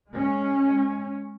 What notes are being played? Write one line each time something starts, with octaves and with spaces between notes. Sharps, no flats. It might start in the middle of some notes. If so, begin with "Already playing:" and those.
G#3 C#4